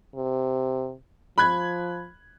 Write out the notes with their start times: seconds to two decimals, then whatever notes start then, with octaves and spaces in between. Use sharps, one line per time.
0.15 C3
1.38 F3 B5 F#6 G#6